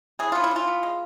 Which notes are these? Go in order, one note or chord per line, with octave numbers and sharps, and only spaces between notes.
E3 G#4
B3 F4
E4
E3 F4
B3
G#3